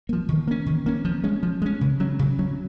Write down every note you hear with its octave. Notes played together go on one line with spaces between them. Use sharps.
F3 A#3
D#3
A#3 C#4
D#3
A#3 C#4
F3
G#3 C#4
F3
G#3 C#4
C#3
F#3 C#4
C#3
F#3 C#4